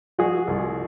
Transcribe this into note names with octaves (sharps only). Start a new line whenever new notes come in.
F3 F#4 G#4
C2